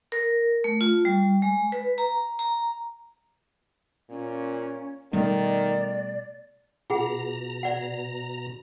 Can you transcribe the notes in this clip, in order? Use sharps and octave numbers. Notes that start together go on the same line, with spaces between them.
A#4
A3
F4
G3
G#3
B4
A#5
A#5
A#2 C#4
B2 D#3 G3 A3 D5
B2 F4 G#4 F#5 A#5
D5 F#5